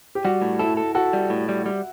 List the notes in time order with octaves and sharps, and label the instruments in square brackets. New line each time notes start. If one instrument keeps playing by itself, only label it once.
[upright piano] G4
[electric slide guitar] G3 [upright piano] F#4
[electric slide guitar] A2
[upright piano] E4 [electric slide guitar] A4
[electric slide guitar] A4
[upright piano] F#4 [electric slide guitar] A4
[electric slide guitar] G3
A2
G3
G3